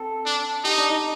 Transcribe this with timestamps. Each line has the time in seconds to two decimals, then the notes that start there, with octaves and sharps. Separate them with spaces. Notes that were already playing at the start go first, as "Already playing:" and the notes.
Already playing: C4 A4
0.26 D4
0.64 D#4 G4
0.78 D4
0.90 D#4